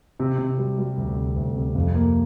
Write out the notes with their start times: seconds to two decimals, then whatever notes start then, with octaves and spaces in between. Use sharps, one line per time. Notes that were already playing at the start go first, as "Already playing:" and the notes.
0.20 C3
0.38 C3
0.58 G3
0.78 G3
0.97 D2
1.16 C3
1.36 D2
1.56 C3
1.75 F2
1.95 A#3